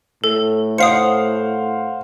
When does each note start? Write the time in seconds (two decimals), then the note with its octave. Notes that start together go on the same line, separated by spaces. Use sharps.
0.24 A2 A4
0.78 C5 F5 F#5 D#6 C7 C#7